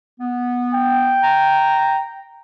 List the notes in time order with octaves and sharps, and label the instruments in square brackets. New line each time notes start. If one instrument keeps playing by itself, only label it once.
[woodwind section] B3
[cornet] G5
[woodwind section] A#5